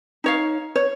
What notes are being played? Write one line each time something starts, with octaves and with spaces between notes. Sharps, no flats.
D#4 C#5 F5
C#5